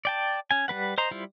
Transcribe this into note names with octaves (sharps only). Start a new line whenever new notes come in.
D5 G5 A5
C#4 G#5
G3 A#3 B4 F#5
C5 D#5 A#5 C6
G3 E4 F4 C5